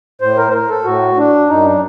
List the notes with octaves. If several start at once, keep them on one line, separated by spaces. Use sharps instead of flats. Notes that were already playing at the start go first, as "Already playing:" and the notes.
A2 C5
A#4
C5
A#4
A4
A2 F#4
D4
F#2 D#4
D4